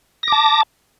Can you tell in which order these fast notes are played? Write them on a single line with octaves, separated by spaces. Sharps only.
A#6 D6 A5